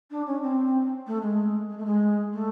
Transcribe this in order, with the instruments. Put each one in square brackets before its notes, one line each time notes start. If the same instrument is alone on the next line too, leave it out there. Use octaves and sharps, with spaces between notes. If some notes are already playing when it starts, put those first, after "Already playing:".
[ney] D4
C#4
C4
A3
G#3
G#3
A3
G#3
A3